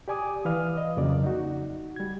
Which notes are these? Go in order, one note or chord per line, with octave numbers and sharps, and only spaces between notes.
G4 D5 G#5 D6 D#6
E3 B4 D5 F5 D#6 F6
D#5
F2 C#3 F#3 A#3 D5
D#4 F#4
G3 G#6